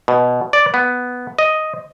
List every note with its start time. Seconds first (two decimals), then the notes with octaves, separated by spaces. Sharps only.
0.08 B2
0.53 D5
0.74 B3
1.39 D#5